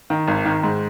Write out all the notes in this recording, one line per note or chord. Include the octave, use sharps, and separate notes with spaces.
D#3
G#1
D#3
G#2